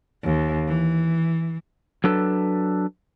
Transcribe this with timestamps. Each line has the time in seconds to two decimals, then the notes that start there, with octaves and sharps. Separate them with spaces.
0.23 D#2
0.67 E3
2.04 F#3 D4 A4 B4